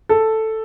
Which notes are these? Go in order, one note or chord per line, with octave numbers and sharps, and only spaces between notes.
A4